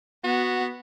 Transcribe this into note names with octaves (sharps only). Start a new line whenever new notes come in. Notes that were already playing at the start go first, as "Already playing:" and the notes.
B3 F#4